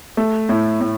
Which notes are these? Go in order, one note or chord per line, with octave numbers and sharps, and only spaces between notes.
A3
A2
A2